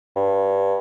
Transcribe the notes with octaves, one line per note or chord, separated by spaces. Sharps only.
G2